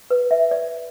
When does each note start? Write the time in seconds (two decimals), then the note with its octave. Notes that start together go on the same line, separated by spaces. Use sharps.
0.10 B4
0.31 E5
0.51 D5